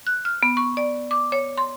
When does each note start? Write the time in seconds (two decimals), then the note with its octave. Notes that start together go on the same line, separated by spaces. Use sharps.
0.07 F#6
0.25 F6
0.43 B3
0.57 C#6
0.77 D5
1.11 D6
1.32 C#5
1.58 C6